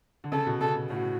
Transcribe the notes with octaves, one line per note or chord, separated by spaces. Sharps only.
D3
C#3 A4
B2
C#3 A4
B2
A2 F#4